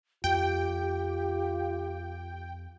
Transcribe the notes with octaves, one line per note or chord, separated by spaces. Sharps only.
F2 F4 G4 G5